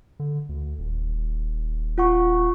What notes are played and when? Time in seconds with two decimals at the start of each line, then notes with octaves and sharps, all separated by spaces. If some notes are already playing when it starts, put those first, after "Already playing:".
0.20 D3
0.49 D2
0.79 D#1
1.98 F4 F#5 C#6